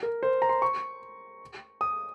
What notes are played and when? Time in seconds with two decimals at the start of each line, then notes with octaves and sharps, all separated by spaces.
0.03 A#4
0.23 C5
0.42 A#5
0.49 C6
0.62 C#6
1.81 D#6